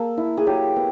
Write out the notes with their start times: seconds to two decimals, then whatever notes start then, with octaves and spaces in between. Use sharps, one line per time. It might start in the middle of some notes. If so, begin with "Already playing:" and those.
Already playing: A#3 A4
0.17 E4
0.37 G#4
0.47 F#3 G4
0.76 B3